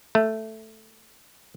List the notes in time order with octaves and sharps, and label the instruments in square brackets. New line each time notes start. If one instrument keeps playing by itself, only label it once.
[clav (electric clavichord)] A3